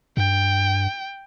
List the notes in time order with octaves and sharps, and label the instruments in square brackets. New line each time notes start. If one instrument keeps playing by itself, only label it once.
[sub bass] G2 [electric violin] G5